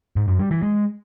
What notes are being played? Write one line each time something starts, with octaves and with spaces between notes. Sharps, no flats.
G#2
F#2
G3
E3
G#3